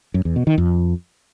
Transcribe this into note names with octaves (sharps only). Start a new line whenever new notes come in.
F#2
E2
B2
D#3
F2